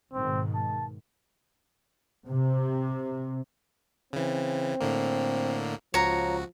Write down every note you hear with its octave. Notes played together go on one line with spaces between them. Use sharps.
G#2 B2 D#3 C4
A5
C3
C#3 E3 C4
A2 D3 A#3
C#2 F3 F#4 C#5 A#5